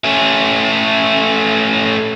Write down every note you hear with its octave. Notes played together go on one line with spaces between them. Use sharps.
A3 C#4